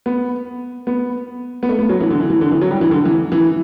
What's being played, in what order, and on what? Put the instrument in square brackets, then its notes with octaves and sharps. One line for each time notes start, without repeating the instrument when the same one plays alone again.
[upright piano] B3
B3
B3
A3
B3
F#3
E3
D3
E3
E3
D3
E3
F#3
G3
E3
D3
E3
E3